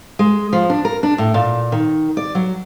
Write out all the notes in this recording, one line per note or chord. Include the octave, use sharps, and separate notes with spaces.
G#3
F3
D4
A#4
D4
A2
A#2
D#3
D5
F#3